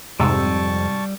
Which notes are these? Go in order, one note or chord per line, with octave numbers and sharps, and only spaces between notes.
F2 G#2 C3 G3 A5 C#6 E6